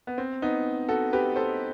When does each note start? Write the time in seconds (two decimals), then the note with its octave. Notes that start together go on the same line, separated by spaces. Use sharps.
0.07 B3
0.18 C4
0.42 B3 D#4
0.89 F#4 A4
1.13 G4 B4
1.36 A4 C5